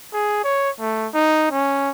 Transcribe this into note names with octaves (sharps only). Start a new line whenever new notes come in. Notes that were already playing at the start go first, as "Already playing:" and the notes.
G#4
C#5
A3
D#4
C#4